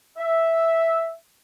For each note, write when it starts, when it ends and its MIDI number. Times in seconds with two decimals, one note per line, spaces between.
0.18 1.13 76